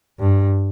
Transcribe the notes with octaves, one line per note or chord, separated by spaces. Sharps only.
G2